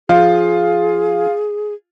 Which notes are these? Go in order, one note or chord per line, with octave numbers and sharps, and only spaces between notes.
F3 F4 G#4